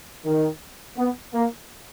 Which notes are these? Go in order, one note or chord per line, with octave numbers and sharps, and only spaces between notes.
D#3
B3
A#3